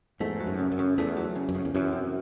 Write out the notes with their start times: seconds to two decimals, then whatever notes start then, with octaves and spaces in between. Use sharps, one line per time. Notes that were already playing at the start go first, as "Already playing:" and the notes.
0.20 E2 G#2 A3
0.40 F#3
0.47 F#2
0.59 C#3
0.71 F#2
0.79 C#3
0.98 E2 A3
1.17 F#3
1.35 C#3
1.49 F#2
1.55 C#3
1.65 E2
1.75 F#2 E3
1.93 C3